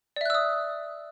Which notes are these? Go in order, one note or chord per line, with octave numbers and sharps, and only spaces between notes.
D5 E5 D#6 E6 F#6